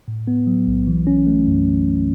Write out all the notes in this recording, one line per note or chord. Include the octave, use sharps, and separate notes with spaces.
A2
B3
F#3
B1
E3
C#4
A3
F#2